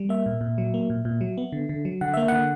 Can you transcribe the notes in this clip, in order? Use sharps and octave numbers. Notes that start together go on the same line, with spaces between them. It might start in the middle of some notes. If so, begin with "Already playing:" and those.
Already playing: G3
A#3 E5
A#2
A#2
F#3
A#3
A#2
A#2
F#3
B3
D3
D3
F#3
D3 F#5
A#3 E5
D3 F#5